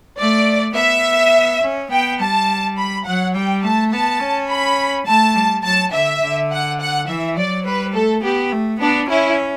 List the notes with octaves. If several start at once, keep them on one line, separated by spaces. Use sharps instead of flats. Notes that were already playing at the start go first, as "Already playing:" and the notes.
A3 D5
B3 E5
C#4
B3 G5
G3 A5
B5
F#3 F#5
G3 G5
A3 A5
B3 A5
C#4
B5
A3 A5
G3
F#3 A5
D3 E5
D3
F#5
F#5
E3 E5
F#3 D5
G3 B4
A3 A4
B3 G4
A3
B3 D4
C#4 E4